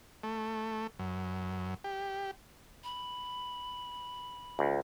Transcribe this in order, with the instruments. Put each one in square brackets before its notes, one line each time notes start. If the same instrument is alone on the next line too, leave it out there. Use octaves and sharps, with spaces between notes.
[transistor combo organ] A3
F#2
G4
[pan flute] B5
[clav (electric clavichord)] C#2